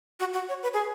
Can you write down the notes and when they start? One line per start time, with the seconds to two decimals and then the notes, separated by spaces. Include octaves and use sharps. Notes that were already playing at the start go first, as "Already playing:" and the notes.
0.20 F#4
0.33 F#4
0.49 C#5
0.63 B4
0.74 G#4